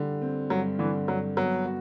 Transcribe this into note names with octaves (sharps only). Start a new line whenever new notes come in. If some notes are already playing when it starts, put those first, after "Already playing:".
Already playing: D3 G3
C4
G2 F#3
D3 E3
G2 F#3
F#3 B3
F#4